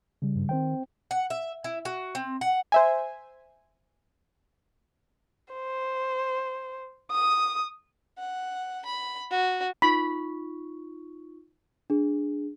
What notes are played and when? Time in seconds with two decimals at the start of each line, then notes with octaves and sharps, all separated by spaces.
0.22 C#3 G3
0.35 G2
0.49 D#3 C4 C5 G5
1.11 F#5
1.30 E5
1.64 E4
1.85 F#4
2.15 C4
2.41 F#5
2.72 C5 E5 G#5
5.54 C5
7.12 D#6
8.18 F#5
8.86 B5
9.31 F#4
9.82 D#4 F4 B5 C#6
11.90 D4 G#4